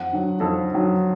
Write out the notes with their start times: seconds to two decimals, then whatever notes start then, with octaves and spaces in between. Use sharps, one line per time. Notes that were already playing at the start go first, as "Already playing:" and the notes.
Already playing: F2 F#5
0.12 D3 F#3
0.40 F2 A4
0.70 D3 F#3